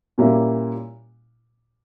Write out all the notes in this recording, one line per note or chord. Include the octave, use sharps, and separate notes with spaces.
A#2 G3 A#3 C#4 E4